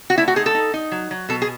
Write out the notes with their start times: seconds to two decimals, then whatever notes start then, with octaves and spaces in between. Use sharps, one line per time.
0.10 F#4
0.18 A3 E4
0.28 F#4
0.36 D#4 G#4
0.46 A4
0.55 D#4
0.74 D#4
0.92 F#3
1.11 F#3
1.29 B2 A4
1.42 G#4